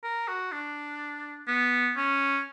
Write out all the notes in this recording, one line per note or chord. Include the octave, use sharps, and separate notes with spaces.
A#4
F#4
D4
B3
C#4